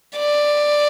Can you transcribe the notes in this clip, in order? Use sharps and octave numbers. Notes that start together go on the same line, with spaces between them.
D5